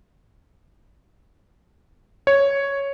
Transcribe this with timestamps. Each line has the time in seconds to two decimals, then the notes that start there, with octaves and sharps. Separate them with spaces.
2.27 C#5